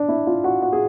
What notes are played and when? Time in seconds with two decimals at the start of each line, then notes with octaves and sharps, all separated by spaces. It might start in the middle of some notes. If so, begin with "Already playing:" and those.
Already playing: D4
0.09 E4
0.27 F4
0.44 F#4
0.62 F#4
0.73 G#4